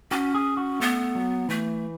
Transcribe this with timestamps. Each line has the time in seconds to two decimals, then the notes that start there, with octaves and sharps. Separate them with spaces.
0.11 C#4 F#4
0.34 G#4
0.57 F#4
0.80 A3 B3
1.15 F#3
1.49 E3 A3